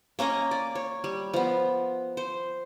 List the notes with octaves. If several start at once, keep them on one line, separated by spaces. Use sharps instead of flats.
A#3 C#4 C#5 D#5
D5
C#5
G3
F3 B3
C5